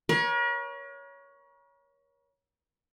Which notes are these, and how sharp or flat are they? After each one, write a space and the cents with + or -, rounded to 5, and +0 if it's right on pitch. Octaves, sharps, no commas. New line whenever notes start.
A#4 +45 C#5 +10